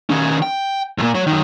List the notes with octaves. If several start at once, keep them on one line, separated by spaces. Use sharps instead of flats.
D#3 C#4
G5
E2 A#2
F#3 C#5
F#2 D#3